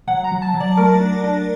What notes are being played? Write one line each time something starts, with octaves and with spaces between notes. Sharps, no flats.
F#3 F#5
A#5
F#3
A5
F#3
D5
A3 A#4
D4
D4